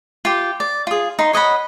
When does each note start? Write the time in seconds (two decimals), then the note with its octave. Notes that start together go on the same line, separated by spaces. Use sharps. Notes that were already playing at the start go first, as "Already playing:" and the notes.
0.25 F4 G4
0.60 D5
0.87 F4 G#4
1.19 D#4 C6
1.33 C#5 D#5 F#5 B5